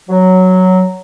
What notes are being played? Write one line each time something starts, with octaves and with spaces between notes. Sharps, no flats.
F#3